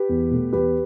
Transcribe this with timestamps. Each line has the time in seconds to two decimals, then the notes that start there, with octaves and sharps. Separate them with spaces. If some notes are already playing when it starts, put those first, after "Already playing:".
Already playing: G4 B4
0.09 E2
0.31 B2 A3
0.52 E2 G4 B4